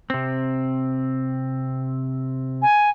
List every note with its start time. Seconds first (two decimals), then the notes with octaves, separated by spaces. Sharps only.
0.10 C3 C4
2.62 G#5